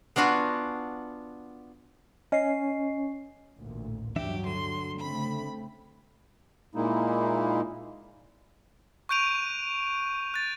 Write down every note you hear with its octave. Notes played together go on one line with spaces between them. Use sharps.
B3 D4 F4 F#4 G#5
C#4 D#5 C7
A1 D2 A#2
G2 E3 F#3 D4 G4 E5
D3 C6
C#3 A3 C4 B5
A#2 G#3 A#3 D#4 E4
C#6 F#6 G6 D7 D#7 F7
F#6 A6